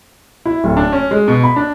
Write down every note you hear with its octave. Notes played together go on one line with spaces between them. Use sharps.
E4
D1
D4
C#4
G#3
B2
B5
D4